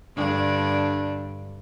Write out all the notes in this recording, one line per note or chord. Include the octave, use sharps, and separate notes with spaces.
G2 D3 D4